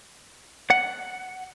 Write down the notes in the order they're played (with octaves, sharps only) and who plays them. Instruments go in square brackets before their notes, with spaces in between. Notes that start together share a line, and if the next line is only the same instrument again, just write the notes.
[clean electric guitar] F#5